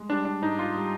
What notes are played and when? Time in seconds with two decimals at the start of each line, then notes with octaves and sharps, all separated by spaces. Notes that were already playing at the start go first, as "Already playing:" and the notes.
Already playing: G#3
0.09 G3 D4
0.25 D4
0.42 G#2 D#4
0.59 F4
0.76 G3